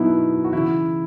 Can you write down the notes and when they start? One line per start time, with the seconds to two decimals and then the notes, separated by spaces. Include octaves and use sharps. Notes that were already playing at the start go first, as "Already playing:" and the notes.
Already playing: B2 F#3 B3 D#4 E4
0.44 F#4
0.53 C#3 E3 E4